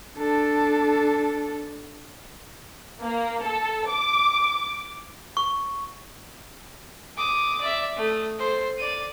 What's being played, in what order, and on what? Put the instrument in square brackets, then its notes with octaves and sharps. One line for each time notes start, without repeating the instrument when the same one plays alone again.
[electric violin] D4 A4
[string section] A#3
A4
D6
[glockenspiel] C#6
[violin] D6 D#6
D5 E5
A3 D#6
A4 C5
D5 D#7